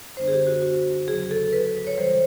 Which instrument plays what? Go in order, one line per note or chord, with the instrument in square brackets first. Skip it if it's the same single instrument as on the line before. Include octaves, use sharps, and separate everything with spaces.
[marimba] F#2 D3 G3 B3 D4 C5
G#4
G4
F#4
F#4
E2 C#3 F#3 G#4
A4
B4
C#5
C#3 E3 G3 C5